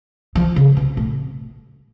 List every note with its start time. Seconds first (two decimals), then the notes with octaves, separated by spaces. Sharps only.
0.35 F3
0.56 C#3
0.77 B2
0.97 A2